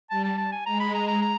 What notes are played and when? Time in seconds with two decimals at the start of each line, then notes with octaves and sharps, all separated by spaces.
0.10 G3 A5
0.24 A5
0.38 A5
0.52 G#5
0.66 G#3 A#5
0.80 B5
0.94 A#5
1.08 A#5
1.22 A#5